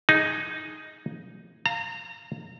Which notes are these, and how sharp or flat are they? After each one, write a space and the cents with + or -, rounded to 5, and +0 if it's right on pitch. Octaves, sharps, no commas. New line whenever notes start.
D#4 +0 G#4 +0
F5 +0 A#5 -30